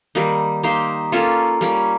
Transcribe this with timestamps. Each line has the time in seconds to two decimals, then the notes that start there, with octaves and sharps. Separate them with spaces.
0.15 D#3 G3 A#3 D#4
0.63 A#3 D#4 G4 C5
1.12 A#3 C#4 F4 A4
1.61 G3 A#3 C#4